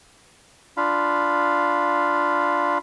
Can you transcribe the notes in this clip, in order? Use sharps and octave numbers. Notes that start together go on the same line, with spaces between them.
D4 F4 F5 B5